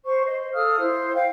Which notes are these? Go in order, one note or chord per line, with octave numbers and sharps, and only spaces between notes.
C5 C#6
C5 D#5
A4 F5 D#6 F6
E4 C5
F5 G5